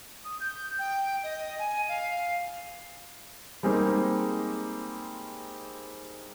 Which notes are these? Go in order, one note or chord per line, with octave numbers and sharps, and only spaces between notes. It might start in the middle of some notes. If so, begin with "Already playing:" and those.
D#6
G6
G5
D#5
G#5
F5
G3 G#3 A#3 C4 D#4